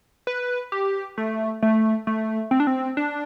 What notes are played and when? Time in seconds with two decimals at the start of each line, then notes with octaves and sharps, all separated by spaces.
0.27 B4
0.72 G4
1.18 A3
1.62 A3
2.07 A3
2.51 C4
2.60 D4
2.67 C4
2.97 D4